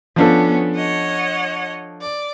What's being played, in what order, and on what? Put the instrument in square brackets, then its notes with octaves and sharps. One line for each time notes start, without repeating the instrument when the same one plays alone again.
[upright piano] F3 D4 A4 [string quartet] B3 C#4
[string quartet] C#5 D#5 F#5
D5